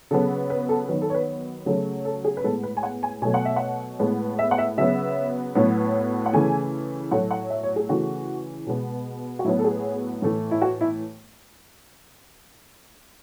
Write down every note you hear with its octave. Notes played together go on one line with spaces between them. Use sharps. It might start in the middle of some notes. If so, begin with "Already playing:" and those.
C#3 F#3 B3 A4
B4
A4
D#3 F#3 B3 B4
A4
C#5
B4
C#3 F#3 A3
A4
G#4
B4
A2 G#3 B3 A4
B4
G#5
F#5
G#5
B2 F#3 A3 G#5
F#5
E5
F#5
A2 G#3 B3
E5
F#5
E5
C#3 F#3 B3 E5
A2 F#3 B3
F#5
C#3 E3 A3 G#5
A2 F#3 A3 F#5
F#5
E5
C#5
G#4
C#3 E3 A3 F#4
B2 G#3 B3
F#4
A2 F#3 B3 E4
A4
G#4
A2 E3 A3
E4
F#4
E4